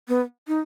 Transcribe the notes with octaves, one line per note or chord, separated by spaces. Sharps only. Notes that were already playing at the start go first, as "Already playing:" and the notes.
B3
D#4